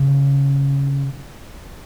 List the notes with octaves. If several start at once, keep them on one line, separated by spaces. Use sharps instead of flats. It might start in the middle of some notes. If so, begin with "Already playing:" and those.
Already playing: C#3